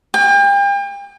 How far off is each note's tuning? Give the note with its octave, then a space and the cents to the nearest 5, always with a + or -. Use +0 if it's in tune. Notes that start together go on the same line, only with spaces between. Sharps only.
G5 +40